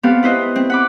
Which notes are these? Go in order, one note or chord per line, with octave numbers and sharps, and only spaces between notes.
B3 C4 G4 A4 F5
E4 B4 C5 D#5
C4
F#5 B5 D6